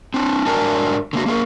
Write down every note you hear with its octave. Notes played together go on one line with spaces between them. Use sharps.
C4 D4
G#2 D4 F#4 A#4 G#5 A5
D3 A#3 F#4
A#3 G#4 A#4